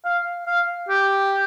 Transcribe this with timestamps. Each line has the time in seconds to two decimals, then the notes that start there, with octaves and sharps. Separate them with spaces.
0.05 F5
0.47 F5
0.89 G4